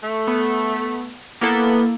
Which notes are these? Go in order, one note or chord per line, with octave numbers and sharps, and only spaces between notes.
A3
B3
A#3 B3 E4 A4